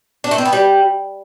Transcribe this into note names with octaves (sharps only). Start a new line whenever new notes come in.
D4
A3
C4
B3
G3